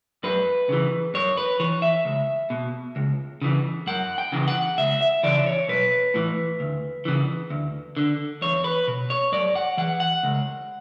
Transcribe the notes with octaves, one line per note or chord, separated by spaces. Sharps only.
F#2 B4
C#3 E3
F#2 C#5
B4
E3 C#5
E5
C#2
B2
C#2
C#3 E3
F#2 F#5
G5
C#3 E3
F#5
C#2 E5
E5
C#3 E3 D5
C#5
B1 B4
A2 E3
D2
C#3 E3
D2
D3
E2 C#5
B4
B2
C#5
F#2 D5
F#5
E3 F#5
F#5
C#2